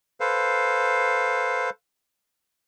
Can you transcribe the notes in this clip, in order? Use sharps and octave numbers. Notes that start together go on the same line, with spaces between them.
A4 B4 C5 F5